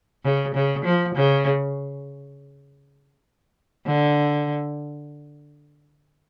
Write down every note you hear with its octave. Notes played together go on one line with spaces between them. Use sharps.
C#3
C#3
F3
C#3
D3